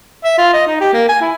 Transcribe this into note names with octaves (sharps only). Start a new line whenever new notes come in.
E5
F4
D#5
D#4
G4
A#3
G#5
E4